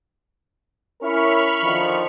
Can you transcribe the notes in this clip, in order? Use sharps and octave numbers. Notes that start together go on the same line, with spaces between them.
C#4 E4 A#4 B5 C#6 F6
D3 D#3 F3